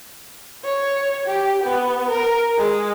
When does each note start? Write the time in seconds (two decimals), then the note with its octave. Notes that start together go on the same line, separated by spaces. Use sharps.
0.64 C#5
1.26 G4
1.64 B3
2.09 A#4
2.58 G#3